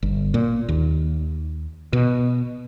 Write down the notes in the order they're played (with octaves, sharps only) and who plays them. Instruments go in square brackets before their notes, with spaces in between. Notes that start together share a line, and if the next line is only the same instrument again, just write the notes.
[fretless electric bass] G1
A#2
D#2
B2